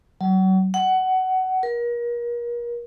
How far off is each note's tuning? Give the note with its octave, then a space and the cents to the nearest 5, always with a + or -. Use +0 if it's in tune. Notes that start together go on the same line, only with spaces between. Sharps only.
F#3 +35
F#5 +20
A#4 +35